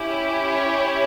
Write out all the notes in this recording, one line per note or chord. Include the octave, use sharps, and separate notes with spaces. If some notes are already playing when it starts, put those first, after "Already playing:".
Already playing: C#4 E4 G4
C#5